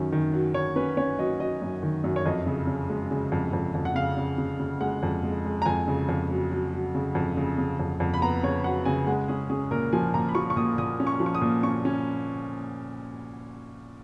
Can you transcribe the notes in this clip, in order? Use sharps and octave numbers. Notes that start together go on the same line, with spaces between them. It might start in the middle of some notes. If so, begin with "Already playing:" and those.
Already playing: F#2 D#3 C#4
D#3
F#3
D#3 C#5
C#4 B4
C#4 C#5
F#3 D#5
F#3 D#5
F#2
D#3
F#2
C#5
F2 D#5
C#3
C#3
G#3
C#3
F2
F2
F2
F#5
C#3 F5
C#3
C#3
C#3
G#3 F#5
F2
G#3
G#3
A#5
F2 G#5
C#3
F2
F#3
F#3
F#3
C#3
F2
C#3
C#3
F2
F2
B5
B3 A#5
C#3 C#5
F#3 F#5
C#3 G#5
G#3 F#5
C#4 G#4
C#4 G#4
A#2 A#4
F3 G#5
A#2 A#5
B5
F3 C#6
C#6
A#2 D#6
A#2 D#6
C#4
C#6
F3
C#6
D#6
A#2
C#4 C#6
C#4